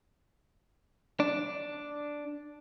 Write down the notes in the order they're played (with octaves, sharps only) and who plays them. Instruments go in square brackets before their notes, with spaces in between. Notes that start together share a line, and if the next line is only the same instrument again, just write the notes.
[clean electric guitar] D4